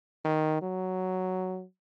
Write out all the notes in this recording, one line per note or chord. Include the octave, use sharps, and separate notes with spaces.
D#3
F#3